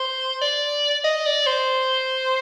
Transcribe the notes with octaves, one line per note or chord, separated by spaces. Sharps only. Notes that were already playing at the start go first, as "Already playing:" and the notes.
Already playing: C5
D5
D#5
D5
C5